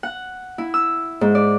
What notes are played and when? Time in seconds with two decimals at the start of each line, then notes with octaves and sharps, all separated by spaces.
0.03 F#5
0.58 E4
0.74 E6
1.21 G#2
1.35 D5